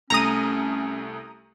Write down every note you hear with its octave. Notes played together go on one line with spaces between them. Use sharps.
C2 A3 C#4 A#5 D#6